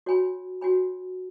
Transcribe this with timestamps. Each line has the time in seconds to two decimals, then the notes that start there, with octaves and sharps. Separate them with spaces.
0.06 F#4 C#5 G#5 B5
0.61 F#4 C#5 G#5 B5